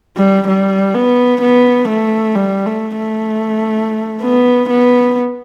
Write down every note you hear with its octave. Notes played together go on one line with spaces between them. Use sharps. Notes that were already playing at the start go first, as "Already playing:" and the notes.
G3
G3
B3
B3
A3
G3
A3
A3
B3
B3